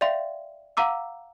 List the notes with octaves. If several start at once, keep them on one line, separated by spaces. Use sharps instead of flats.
D5 E5 F5 G5 C6
F5 F#5 A#5 D6 E6